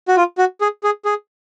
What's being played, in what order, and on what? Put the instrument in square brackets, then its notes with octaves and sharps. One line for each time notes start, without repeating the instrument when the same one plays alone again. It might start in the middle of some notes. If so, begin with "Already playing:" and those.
[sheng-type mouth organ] F#4
F4
F#4
G#4
G#4
G#4